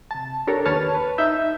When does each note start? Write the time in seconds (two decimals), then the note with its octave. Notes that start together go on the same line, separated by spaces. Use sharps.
0.11 C3 A5
0.47 D4 G4 A4 A#4 C#5
0.65 D#2 B4 C#5 A5 F6
0.95 B4
1.18 D#4 E5 E6 G6